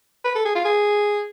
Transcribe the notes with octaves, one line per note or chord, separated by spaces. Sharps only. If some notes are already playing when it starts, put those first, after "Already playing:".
B4
A4
G#4
F4
G#4